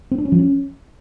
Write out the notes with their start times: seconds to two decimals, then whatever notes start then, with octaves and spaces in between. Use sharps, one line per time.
0.11 C4
0.18 D4
0.25 C#4
0.32 F3
0.39 C#4